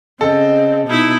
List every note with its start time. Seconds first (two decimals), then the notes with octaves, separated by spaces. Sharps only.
0.21 C#3 C4 A4 D#5
0.88 B2 D#4 E4